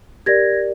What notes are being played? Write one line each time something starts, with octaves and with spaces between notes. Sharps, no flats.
G4 A#4 D5 G#6 A#6